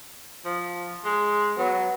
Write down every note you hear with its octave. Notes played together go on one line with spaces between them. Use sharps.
F3
G#3
F#3 B3